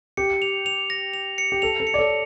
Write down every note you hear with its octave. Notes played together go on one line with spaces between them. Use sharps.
G4 C#7
F7
F7
A#6
F7
C#7
G4
A4 F7
A4
C#7
D5
A4 C#5